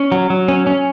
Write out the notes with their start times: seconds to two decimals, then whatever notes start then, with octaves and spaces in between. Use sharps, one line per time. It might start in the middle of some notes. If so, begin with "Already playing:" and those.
Already playing: C#4
0.12 F#3
0.30 F#3
0.48 C#4
0.67 C#4